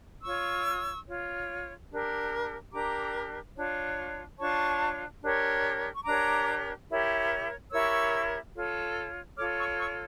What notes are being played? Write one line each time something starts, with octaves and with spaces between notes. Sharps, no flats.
F4 C#5 C#6 E6
F4 C#5
D4 G4 A#4
D4 G4 A#4 A#5 D6
D4 F4 C#5
D4 F4 C#5 A5 C#6
D4 G4 A#4 C#5
C#6
D4 G4 A#4 C#5 A#5 D6
E4 G4 A#4 C#5
E4 G4 A#4 C#5 C#6 E6
F4 A4 C#5
F4 A4 C#5 D6 F6
C#6 E6
C#6 E6